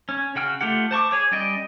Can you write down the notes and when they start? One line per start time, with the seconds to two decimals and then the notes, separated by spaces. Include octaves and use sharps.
0.09 C#4
0.35 C#3 F#4 G5 F6
0.61 A3 F4 G4 F#5
0.91 C5 A5 C#6 D6
1.11 G#4 C#5 D6
1.31 G3 C#4 D5 D#5 G5